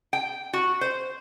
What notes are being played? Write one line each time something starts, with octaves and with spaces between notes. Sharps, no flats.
G5
F#4
C5